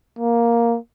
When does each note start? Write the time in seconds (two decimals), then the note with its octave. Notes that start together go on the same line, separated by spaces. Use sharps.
0.19 A#3